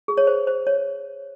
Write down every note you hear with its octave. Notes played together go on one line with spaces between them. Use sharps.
G#4
C#5
C5
C5
C#5